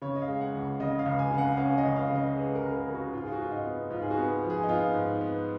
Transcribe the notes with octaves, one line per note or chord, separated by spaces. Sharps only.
C#3 C#5
D#5
F5
G#3
F#5
C#2
C#3 D#5
F5
C#2
G#5
C#3 F5
F#5
C#4 F5
D#5
C#2
F5
C#3
D#5
G#3 B4
A#4
C#2
A#4
C#3
F#4
G#2 F4
G#4
F#4
G#2 F4
D#4
B3
G#2 F4
G#4
F#4
B3
F3
G#4
D#4
B3 F4
G#2
B3